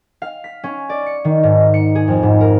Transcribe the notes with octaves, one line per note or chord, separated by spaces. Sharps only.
F5
B6
C#4
D5
C#7
D#3
G#2
C#7
G#4
F2
G#2
A#4